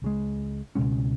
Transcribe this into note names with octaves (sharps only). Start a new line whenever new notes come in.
C#2 C#3 G#3
C#2 B2 G#3 C#4